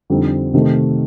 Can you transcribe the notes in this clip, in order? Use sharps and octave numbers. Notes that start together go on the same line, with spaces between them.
F2 D3 G3 C4 D#4
C3 D#3 A3